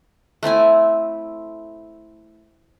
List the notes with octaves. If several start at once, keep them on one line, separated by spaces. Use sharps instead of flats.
A3 C4 E4 G#5